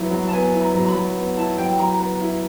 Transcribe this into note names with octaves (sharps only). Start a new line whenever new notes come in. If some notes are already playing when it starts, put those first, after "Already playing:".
Already playing: F#3 B3 E4
F#3
A5
B3 G#5
E4
A#5
F#3
A#5
B5
F#3
B3
E4 A5
F#3 G5
F#3 A#5
B3 A#5
E4